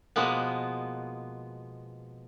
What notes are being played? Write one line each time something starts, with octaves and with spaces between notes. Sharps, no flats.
B2 F3 G#3 A#3 B3